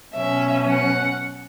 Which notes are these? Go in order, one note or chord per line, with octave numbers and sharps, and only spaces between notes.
B2 F#3 C#4 E5
F#5